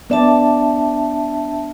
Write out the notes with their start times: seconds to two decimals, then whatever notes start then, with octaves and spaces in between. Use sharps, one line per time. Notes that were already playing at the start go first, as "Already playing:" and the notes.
0.10 B3 D4 D5 E5 A5